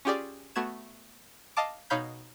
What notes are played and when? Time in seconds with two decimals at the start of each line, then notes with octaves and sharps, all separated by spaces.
0.05 C#4 F4 G4 G#4 D5
0.55 A3 B3 F#4 G#6 E7
1.57 D#5 F5 A5 D6
1.90 B2 D#4 C#5 F5 B5 G6